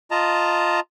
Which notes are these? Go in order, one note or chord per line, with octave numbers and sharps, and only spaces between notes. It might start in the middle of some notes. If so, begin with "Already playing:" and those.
F4 D#5 A5 A#5